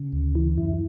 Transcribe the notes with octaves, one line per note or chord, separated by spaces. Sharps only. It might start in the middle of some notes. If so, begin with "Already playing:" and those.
Already playing: C#3
D2
E3
F#2 E4